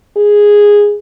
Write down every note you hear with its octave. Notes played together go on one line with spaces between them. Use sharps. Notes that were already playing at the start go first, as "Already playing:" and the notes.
G#4